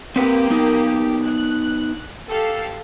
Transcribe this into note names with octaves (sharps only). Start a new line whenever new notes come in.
A#3 C4 G4 B4
B3 D#4
F#6
G4 A4 F5